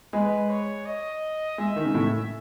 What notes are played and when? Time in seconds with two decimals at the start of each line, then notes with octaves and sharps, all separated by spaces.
0.13 G#3 B4
0.49 C#5
0.86 D#5
1.58 G#3 E5
1.76 D#3
1.85 C#3
1.94 A2